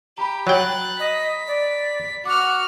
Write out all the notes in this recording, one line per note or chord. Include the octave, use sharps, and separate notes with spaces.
G4 A#5 B5
F#3 G5 F#6 A6
D#5 B6
D5
F#4 F#5 D6 F6